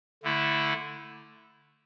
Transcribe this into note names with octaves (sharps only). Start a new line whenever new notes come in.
D3 A3 E4